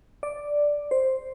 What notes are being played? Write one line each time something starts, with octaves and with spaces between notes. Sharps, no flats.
D5
C5